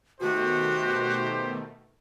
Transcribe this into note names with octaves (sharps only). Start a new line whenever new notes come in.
B2 D#3 A3 F#4 G4 C5